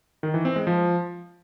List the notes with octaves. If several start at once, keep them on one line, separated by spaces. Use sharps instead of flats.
D#3
E3
C4
G#3
F3